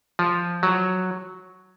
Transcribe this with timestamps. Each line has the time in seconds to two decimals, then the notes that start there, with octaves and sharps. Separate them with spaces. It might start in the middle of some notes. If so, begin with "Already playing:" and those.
0.19 F3
0.63 F#3